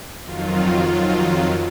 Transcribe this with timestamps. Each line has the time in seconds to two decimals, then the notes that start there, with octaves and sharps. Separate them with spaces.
0.22 F2 D#3 F#3 F4
0.88 F2 D#3 F#3